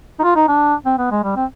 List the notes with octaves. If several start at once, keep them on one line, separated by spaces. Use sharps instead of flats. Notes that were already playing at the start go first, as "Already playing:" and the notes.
D#4
F4
D#4
D4
C4
B3
G#3
G3
C4